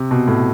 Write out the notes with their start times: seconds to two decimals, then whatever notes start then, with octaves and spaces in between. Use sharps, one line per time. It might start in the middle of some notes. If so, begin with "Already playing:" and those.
Already playing: C3
0.11 B2
0.27 A2